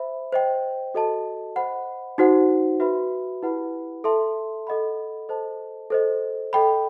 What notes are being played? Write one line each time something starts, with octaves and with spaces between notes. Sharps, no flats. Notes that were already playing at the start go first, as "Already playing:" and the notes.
Already playing: C5 E5 B5
C5 D#5 G5
F#4 A4 D#5 A5
C5 D#5 F#5 B5
D#4 F#4 C5 F#5
F#4 B4 E5 B5
E4 G4 B4 F#5 B5
A4 E5 A5 C6
A4 D#5 F#5 B5
A4 C5 D#5 A5
A4 C5 D#5
A4 D#5 G5 B5